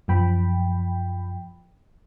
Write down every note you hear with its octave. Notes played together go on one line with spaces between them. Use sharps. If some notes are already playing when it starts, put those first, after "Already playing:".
F#2 F3 G5 B5